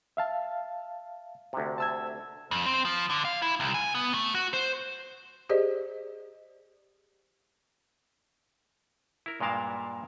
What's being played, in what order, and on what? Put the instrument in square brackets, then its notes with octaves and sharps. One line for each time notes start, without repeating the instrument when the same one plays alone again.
[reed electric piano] E5 F5 A5
[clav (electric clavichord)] D2 C3
[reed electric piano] A5 E6 G#6
[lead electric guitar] F2
C4
F3
D3
F5
E4
C2
G#5
B3
A3
F#4
C5
[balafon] G4 G#4 C5 D5 D#5
[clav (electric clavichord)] E4 A#4
G2 A#2 G#3 A#4 F5 A5